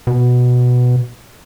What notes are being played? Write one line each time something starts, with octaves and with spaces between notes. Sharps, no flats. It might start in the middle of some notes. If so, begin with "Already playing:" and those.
B2